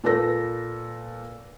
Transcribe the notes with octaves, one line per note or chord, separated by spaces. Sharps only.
A#2 A4 B4 E6 A#6